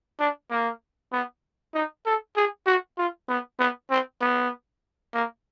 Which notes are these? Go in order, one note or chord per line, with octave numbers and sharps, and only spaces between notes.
D4
A#3
B3
D#4
A4
G#4
F#4
F4
B3
B3
C4
B3
A#3